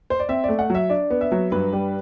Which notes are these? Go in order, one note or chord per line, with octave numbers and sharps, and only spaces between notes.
C5
D5
C4 E5
A3 D5
F#5
F#3 E5
D4 D5
B3
E5
F#3
G2 B4
G3